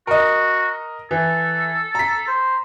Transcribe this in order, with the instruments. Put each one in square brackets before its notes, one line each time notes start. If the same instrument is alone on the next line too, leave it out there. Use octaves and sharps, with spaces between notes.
[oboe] F#4 [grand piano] A#4 D#5
[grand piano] E3 [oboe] A4
[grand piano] A#5 B6
[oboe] C5